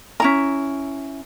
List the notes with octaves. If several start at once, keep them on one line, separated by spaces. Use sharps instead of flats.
C#4 E4 A#5